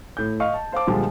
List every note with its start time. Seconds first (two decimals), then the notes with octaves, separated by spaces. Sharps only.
0.17 A2 G6
0.40 D#5 F5 C#6 F6
0.54 A5
0.72 C5 F5 A5 D6
0.87 A#2 D3 F3 G3 G#3